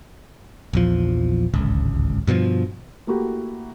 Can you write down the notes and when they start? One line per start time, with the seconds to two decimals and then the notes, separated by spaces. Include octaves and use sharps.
0.73 A#1 E2 F3
1.54 D1 G#1 C#2
2.27 G2 B2 D#3 F3
3.07 A3 A#3 E4 F#4 G4